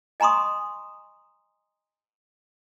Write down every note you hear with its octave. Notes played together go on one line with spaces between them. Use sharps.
D#5 G#5 A#5 C6 C#6 D#6